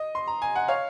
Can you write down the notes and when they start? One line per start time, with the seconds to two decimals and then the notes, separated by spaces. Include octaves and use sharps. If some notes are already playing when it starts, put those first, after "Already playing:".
Already playing: D#5
0.15 C6
0.27 A#5
0.42 G#5
0.56 F#5
0.68 C#5 F5